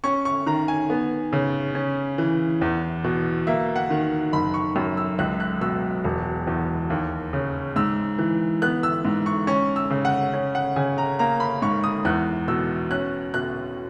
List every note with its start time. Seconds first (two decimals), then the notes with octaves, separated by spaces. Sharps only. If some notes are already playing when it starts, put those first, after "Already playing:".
0.04 C#4 C#6
0.25 C#6
0.46 D#3 A#5
0.68 G#5
0.90 B3
1.33 C#3
1.75 C#4
2.18 E3
2.61 E2
3.04 B2
3.47 A#3 E5
3.76 F#5
3.90 D#3
4.33 F#1 B5
4.54 C#6
4.76 F#2
4.97 E6
5.19 C#2 F#6
5.40 F#6
5.61 B2 E6
6.04 E1
6.47 E2
6.90 D#2
7.33 C#3
7.76 G#2 E6
8.18 E3
8.62 B3 F#6
8.83 E6
9.05 G#2
9.26 C#6
9.47 C#4 C#6
9.76 E6
9.90 C#3
10.05 F#5
10.33 C#4
10.55 F#5
10.76 C#3 G#5
10.98 A#5
11.19 A#3 A#5
11.40 B5
11.62 G#2 C#6
11.84 D#6
12.05 E2 F#6
12.48 B2 E6
12.90 C#4 F#6
13.34 B2 F#6